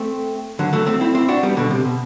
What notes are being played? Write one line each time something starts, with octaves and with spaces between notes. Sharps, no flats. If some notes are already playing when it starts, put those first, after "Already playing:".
Already playing: A3 C4
D3 F#3
F#3 A3
A3 C4
C4 E4
C4 E4
D4 F#4
G3 B3
B2 D3
C3
B2